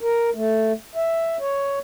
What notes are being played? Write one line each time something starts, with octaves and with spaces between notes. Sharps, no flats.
A#4
A3
E5
C#5